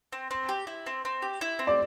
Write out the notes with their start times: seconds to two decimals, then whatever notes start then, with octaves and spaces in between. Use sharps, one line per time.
0.13 C4
0.31 C4
0.49 G4
0.67 E4
0.86 C4
1.05 C4
1.22 G4
1.41 E4
1.59 C4
1.67 D5